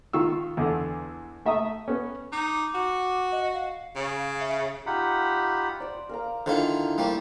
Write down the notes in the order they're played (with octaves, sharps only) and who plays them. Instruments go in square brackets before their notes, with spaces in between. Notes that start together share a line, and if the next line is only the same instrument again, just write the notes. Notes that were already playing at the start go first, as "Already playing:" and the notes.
[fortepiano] D#3 F4 C#6 E6
E2 D3 A4
A3 E5 A#5 D#6
B3 C#4
[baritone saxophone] D#4 [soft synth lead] D6
[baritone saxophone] F#4
[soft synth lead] D#5
F5
[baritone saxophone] C#3
[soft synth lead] E5
[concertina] D#4 F4 G4 F#5 B5
[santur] C5 D5
A#4 F5 A#5
[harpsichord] D3 D#3 F4 [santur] E4 C5
[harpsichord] G3 A#3 [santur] C#6 D#6 E6